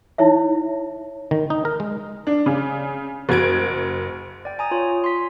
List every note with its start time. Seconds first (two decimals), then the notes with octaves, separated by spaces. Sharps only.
0.18 D#4 E4 C#5 E5
1.31 D#3
1.50 D#4
1.65 A#4
1.80 G#3
2.27 D4
2.46 C#3
3.29 F#1 F#4 G#6 D7
4.45 D5 G5
4.59 G#5 A#5 D#6
4.71 F4 C#5
5.04 C6 B6